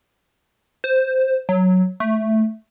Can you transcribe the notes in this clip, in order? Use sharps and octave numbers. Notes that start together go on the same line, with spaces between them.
C5
F#3
A3